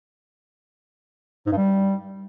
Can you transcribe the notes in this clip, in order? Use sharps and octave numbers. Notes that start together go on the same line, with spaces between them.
G#2
G2
G3